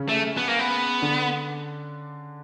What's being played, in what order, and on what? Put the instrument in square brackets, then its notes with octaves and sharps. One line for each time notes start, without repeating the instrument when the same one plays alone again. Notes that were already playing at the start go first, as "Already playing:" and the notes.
Already playing: [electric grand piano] C#3 C#4
[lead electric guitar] A3
B3
A#3
B3
[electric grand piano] D3 D4